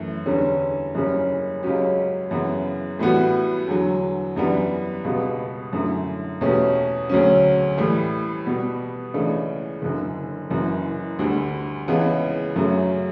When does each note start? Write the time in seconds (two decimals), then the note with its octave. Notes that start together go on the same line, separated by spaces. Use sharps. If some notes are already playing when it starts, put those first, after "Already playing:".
Already playing: F#2 E3 A3
0.26 E2 D3 G3 C#4
0.95 F#1 F#2 C#3 G3 C#4
1.63 C#2 C#3 F#3 C#4 G4
2.31 F#2 C#3 E3 B3
2.99 A2 E3 G3 B3 F#4
3.68 E2 D3 F#3
4.36 F#2 E3 G3 B3 D4
5.04 C#2 B2 G3 B3
5.73 F#2 D3 A3 E4
6.41 E2 B2 A3 C#4 G4
7.09 D2 C#3 F#3 C#4
7.78 A2 E3 G3
8.46 B2 G3 B3
9.14 C#2 C#3 E3 A3 D4
9.82 F#1 F#2 D3
10.50 F#1 F#2 E3
11.19 D2 D3 G3
11.88 C#2 C#3 E3 B3
12.56 F#2 C#3 F#3 A3